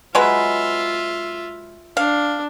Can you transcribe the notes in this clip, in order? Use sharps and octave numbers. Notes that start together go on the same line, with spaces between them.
F#3 G#3 F4 B4 E5
D4 F5